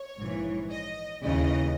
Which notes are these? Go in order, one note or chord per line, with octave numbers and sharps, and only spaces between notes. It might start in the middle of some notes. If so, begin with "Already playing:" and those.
Already playing: C#5
A#1 G#2 E3
D#5
D#2 C#3 E3 D#5